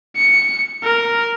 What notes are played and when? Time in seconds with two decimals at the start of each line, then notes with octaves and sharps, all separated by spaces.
0.16 C#7
0.84 A#4